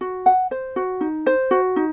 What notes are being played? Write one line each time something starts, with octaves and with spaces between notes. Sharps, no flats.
F#4
F#5
C5
F#4
D#4
C5
F#4
D#4